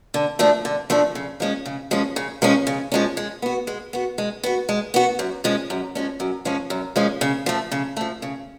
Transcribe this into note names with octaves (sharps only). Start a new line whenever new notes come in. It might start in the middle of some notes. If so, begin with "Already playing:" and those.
D3
F3 A3 D4
D3
F3 A3 D4
C#3
F3 G#3 C#4
C#3
F3 G#3 C#4
C#3
F3 G#3 C#4
C#3
F3 G#3 C#4
G#3
B3 F#4
G#3
B3 F#4
G#3
B3 F#4
G#3
B3 F#4
F#2
F3 G#3 C#4
F#2
F3 G#3 C#4
F#2
F3 G#3 C#4
F#2
F3 G#3 C#4
C#3
F3 A3
C#3
F3 A3
C#3